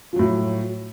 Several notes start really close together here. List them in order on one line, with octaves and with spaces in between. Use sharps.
F3 F#3 A2